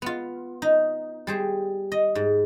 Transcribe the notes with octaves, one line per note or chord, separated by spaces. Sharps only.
B3 F4
D#4
G3 G#4 C5
D#5
G#2